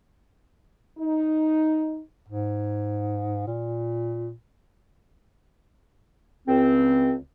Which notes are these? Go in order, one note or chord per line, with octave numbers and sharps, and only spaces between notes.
D#4
G#2
A#2
C#2 C4